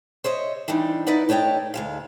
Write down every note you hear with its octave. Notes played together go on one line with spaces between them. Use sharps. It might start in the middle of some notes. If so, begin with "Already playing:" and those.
C5 C#5 D#5 E5
E3 G3 D4 D#4
D#4 E4 B4 D5 F#5
A3 D4 C#5 D#5 G5
D2 G#3 F5